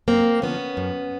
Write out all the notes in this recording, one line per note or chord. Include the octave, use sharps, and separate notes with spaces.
F#2 A#3 C4
D3 F3 B3 C#4
F#2